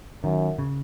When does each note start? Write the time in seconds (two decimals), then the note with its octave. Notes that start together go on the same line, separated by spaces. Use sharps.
0.24 F#2 D#3
0.59 C#3